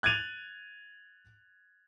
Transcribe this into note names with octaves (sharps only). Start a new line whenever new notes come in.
F#6 G#6 A6 D#7 F7